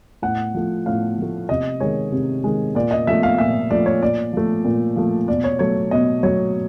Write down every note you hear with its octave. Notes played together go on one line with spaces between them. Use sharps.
A2 F#5
F3 A3
A2 F5
F3 A3
C3 D#5
D#3 G#3 C#5
C3
D#3 G#3
A#2 D5
D#5
F3 A3 E5
F5
A#2 E5
F3 A3 D5
C#5
A#2 D5
F3 A3
A#2
F3 A3
B2 D5
C#5
F#3 A3 C#5
B2 D#5
F#3 A3 C#5